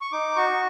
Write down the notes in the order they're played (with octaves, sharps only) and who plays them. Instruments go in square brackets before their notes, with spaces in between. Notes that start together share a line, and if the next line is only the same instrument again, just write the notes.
[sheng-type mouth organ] C#6
D#4 D6
F#4 C#6